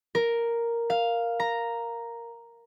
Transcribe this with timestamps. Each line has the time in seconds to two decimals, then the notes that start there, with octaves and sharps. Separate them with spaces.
0.15 A#4
0.90 F5
1.40 A#5